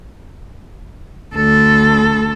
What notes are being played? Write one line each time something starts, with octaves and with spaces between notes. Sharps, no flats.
D2 A4